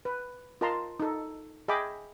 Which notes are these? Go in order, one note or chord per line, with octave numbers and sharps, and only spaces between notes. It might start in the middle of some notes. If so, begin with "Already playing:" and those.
B4
F4 A#4 D#5 A5 A#5 C6
D#4 A4
G#4 D#5 E5 G5 B5 D6